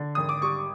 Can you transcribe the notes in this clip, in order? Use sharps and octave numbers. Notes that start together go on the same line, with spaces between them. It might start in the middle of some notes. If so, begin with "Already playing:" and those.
Already playing: D3
G#1 D#6
D6
G3 C#6